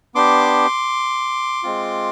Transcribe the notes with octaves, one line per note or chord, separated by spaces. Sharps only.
B3 D4 G4 C6 D6
G#3 C4 F4